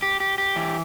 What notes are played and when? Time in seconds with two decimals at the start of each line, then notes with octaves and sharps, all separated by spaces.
0.02 G4
0.20 G4
0.38 G4
0.56 E3